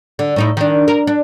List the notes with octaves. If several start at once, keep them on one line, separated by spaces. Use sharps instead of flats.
D3
A2 D#4 E4
D#3 D4
A#4
D4